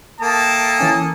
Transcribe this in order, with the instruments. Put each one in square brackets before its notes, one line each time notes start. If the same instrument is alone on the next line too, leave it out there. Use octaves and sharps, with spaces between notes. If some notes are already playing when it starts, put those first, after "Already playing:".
[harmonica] A#3 A4 D#6 [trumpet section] E5 G5 A5
[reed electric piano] E3 C#4 G#5